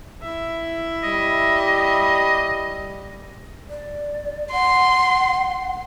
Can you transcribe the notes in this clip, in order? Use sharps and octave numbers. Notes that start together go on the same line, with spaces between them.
E4 E5
G3 D#5
D5
F#5 C6